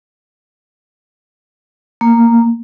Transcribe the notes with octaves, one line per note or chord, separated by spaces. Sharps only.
A#3